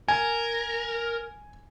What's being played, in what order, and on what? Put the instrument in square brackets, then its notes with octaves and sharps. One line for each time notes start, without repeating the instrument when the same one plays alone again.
[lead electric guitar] A#4 [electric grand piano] G#5